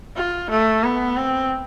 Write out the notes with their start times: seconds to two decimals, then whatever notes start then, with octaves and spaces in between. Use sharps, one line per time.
0.16 F4
0.50 A3
0.84 B3
1.17 C4